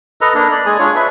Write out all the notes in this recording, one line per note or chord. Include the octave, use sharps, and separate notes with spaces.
A4 B4 D#5 A#5
A#3 D4
D5
G#3 G#4 G#5
D4 F4 C#5
B4 E5